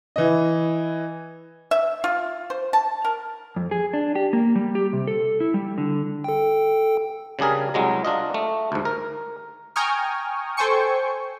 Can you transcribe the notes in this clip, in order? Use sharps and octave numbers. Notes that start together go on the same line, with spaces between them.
E3 D#5
E5
F4
C5
A5
A#4
F2
G#4
D4
G4
A#3
G3
G4
C3
A4
E4
G3
D3
A4 G5
C#3 G3 D4 G#4 A#4
C2 F#3 G#3 A#5
D4 F4 D#5
A3
D2 G#2
A#4
G5 G#5 A#5 C#6 D#6 F6
A4 C5 G5 G#5 C#6 C#7